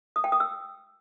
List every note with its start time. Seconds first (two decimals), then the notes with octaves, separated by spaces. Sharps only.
0.16 D#6
0.24 G5
0.32 D#6
0.40 E6